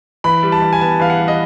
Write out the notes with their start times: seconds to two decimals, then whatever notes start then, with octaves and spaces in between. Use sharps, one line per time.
0.24 E3 B5
0.43 G3
0.52 A5
0.62 E3
0.73 G#5
0.81 B3 A5
1.00 E3 F5
1.10 F#5
1.19 G3
1.28 D#5